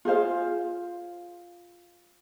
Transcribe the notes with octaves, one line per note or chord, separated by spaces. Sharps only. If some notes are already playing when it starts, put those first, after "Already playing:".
F4 G#4 C5 F5